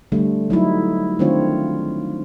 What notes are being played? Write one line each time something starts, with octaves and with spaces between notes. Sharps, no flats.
D3 G3 A3
F#3 D#4 E4
D#3 A3 C4 D4 F4 C#5